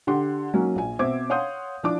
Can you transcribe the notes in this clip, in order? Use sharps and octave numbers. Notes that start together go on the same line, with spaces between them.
D3 G4 F#5 C6
F#3 A#3 C#4 D#4 F#4
A#1 G#5
B2 C4 C5 E5 D6 G#6
C#5 F5 F#5 C6 D#6 G6
F3 D4 E4 D6